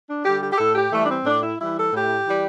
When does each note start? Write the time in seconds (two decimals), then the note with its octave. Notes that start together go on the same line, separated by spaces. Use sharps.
0.08 D4
0.25 D3 G3 G4
0.42 G4
0.52 G4
0.58 A2 A4
0.75 G4
0.91 E3 G3 A3
1.03 D4
1.08 C4
1.25 A2 D4
1.42 E4
1.59 E3 G3 E4
1.76 A4
1.92 A2 G4
2.26 E3 G3